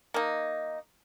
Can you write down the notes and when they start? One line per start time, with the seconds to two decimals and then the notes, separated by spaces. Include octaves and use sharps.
0.14 A#3 D#4